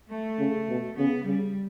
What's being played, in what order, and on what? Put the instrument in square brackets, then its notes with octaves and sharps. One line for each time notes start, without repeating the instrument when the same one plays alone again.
[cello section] A3
[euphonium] C#3
B2
[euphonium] C#3 [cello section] B3
[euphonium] C#3 [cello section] G3